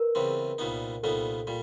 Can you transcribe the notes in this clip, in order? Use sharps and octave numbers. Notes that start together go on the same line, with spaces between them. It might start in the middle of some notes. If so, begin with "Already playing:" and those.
Already playing: A#4 B4
E2 C#3 E3 G3 C4
C2 A#2 G3 B3 D#4
C2 A#2 G3 B3 D#4 A4
A#2 G3